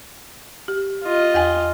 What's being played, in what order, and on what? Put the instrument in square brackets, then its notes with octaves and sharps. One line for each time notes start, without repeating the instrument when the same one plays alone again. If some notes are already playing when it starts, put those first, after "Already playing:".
[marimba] G4
[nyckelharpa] F4 D#5
[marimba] E2 G5 G#5